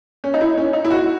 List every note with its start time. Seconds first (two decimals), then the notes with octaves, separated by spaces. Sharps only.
0.24 C#4
0.34 D#4
0.41 E4
0.57 C#4
0.73 D#4
0.84 E4
0.90 F#4